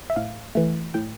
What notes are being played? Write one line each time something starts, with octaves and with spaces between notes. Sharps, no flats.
E5
A2 F5
E3 A3
A2 G5